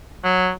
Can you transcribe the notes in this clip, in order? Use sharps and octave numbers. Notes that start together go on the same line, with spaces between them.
F#3